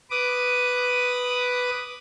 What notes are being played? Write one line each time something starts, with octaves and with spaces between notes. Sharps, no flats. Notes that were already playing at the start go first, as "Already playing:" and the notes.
B4 D6 D#6